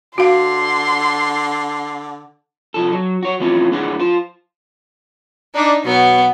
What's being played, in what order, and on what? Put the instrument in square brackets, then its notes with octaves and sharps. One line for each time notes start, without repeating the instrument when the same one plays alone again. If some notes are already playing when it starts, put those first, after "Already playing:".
[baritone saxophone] D3 [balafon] F#4 F5 [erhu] C6
[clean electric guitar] C2 F3 A4
F#3
F#4 C#5
E3 F3 A3 C4 C#4 F4
D2 A2 D4 G#4 F#5
F4 C5
[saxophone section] D4 [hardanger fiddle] D#4
[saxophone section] B2 F#3 [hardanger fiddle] B3